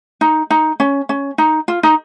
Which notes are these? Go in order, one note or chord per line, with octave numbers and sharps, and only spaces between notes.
D#4
D#4
C#4
C#4
D#4
F4
D#4